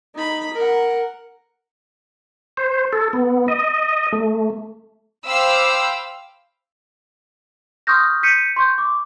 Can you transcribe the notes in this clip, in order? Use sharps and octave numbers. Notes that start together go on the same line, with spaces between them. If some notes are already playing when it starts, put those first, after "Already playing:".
D#4 B5
A#4 F#5
C5
A4
B3
D#5
A3
C5 F5 G5 B5 D6 E6
C6 C#6 D#6 F6 G6 A#6
G6 B6 C#7 D#7
C6 C#6 G6
D6